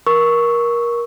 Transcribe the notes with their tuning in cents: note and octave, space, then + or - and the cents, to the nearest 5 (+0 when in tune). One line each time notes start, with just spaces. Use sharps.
A#4 +20 C#6 +0 E6 -15